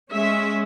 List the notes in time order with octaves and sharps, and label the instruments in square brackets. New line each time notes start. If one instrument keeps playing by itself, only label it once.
[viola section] G#3 C#4 E5